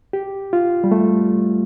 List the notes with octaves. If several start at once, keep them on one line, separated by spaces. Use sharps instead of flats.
G4
F4
G3
A3